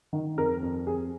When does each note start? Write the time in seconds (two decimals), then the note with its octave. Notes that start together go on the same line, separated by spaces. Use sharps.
0.13 D#3
0.37 F2 A#4
0.63 F2
0.87 F2 G#4